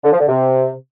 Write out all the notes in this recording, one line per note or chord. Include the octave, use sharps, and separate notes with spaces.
D3
F3
D3
C3